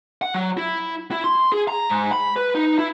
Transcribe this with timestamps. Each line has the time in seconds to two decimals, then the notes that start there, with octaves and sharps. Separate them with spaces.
0.22 F#5
0.34 F#3
0.57 E4
1.11 E4
1.24 C6
1.52 G#4
1.68 A#5
1.90 G#2
2.12 B5
2.36 B4
2.55 D#4
2.79 E4